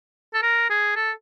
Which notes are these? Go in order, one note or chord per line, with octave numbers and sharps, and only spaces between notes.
A4
A#4
G#4
A4